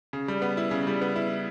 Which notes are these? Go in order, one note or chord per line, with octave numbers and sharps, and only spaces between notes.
C#3
G3
B3
E4
C#3
G3
B3
E4